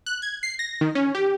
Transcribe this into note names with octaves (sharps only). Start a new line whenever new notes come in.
F#6
G#6
C7
A#6
D#3
C#4
G4